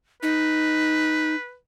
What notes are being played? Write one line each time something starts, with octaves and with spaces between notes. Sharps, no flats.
D#4 B4